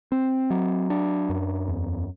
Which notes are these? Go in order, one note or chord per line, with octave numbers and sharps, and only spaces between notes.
C4
F#3
D4
F#2
E2